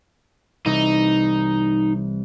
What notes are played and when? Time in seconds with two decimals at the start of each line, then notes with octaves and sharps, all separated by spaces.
0.66 C2 E3 D#4